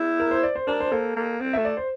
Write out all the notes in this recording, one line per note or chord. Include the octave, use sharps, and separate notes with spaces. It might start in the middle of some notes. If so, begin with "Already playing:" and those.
Already playing: E4
A#4
C5
D5
C5
D4 A#4
C5
A#3 A4
A#3
C4
A3 E5
D5
C5